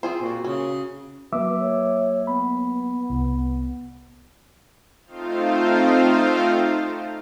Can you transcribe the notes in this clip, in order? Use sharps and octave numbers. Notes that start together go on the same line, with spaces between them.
C4 F4 G#4 C5
A#2 F#4
C#3 C#4
F#3 A#3 B4 E5 D6 E6
C#5
B3 B5
C2
A3 C4 D#4 F4 C5 F5